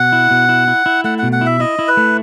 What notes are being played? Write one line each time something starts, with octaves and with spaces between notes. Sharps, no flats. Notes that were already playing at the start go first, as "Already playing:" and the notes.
Already playing: B2 F#5
E4
B2
E4
E4
E4
A3 F#5
B2 F#5
F#5
E4 E5
E4 D#5
E4
B4
A3